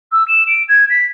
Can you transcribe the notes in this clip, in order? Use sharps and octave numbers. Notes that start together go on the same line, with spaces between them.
E6
E7
D7
G#6
B6